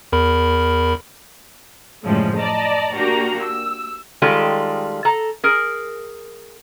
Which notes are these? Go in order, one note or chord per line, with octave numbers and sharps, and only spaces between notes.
E2 A#4 B5
F#2 A2 C#3 F3 G3 G#3
D5 D#5 A5 A#5
A#3 D4 F#4 G4 A#5
E6
D#3 G3 G#3 F4 G4 A4
A4 A#5
G#4 A#4